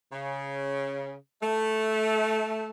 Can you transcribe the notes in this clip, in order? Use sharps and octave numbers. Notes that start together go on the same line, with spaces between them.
C#3
A3